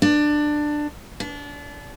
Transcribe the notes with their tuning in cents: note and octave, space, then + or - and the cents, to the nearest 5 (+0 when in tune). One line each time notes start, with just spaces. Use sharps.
D4 +15
D4 -30